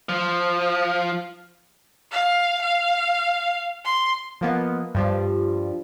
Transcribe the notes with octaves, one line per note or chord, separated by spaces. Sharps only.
F3
F5
F5
C6
F3 A#3 B3 D#5
G2 F3 G3